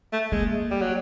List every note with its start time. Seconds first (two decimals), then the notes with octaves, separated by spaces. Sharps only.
0.13 A3
0.32 G#3 A#3
0.71 G3
0.82 F#3